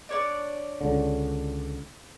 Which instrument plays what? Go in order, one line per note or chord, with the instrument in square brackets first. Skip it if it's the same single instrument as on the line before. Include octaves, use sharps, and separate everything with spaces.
[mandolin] D4 C#5 D5
[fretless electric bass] C#2 D3